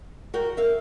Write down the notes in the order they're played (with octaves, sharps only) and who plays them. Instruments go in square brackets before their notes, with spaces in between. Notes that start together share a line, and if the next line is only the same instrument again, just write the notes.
[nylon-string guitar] F#4 A#4 G5
[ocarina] A#4 [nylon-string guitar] E5 F5